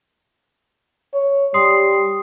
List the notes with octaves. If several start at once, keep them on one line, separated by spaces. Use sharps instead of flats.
C#5
G3 C6 D#6 C7